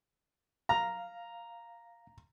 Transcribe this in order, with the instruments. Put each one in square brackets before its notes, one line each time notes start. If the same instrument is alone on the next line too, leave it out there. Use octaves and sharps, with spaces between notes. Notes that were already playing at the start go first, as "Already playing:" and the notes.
[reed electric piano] F5 [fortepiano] A#5